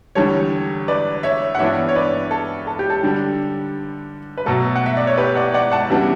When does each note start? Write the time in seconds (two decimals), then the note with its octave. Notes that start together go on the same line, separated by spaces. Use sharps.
0.15 E2 D3 G3 A4 C#5
0.88 B4 D5
1.23 C#5 E5
1.55 F#5
1.59 G2 E3 B3 D4 C#5 E5
1.89 C#5
1.95 B4 D5
2.31 A4
2.67 A4
2.79 G4
2.90 A4
3.03 D3 G3 D4
4.37 B4
4.46 B2 F#3 A3 A4
4.76 F#5
4.86 E5
4.97 D5
5.07 C#5
5.17 G4 B4
5.35 D5 F#5
5.54 D5 F#5
5.71 F#5 A5
5.90 C#3 E3 G3 B3 D4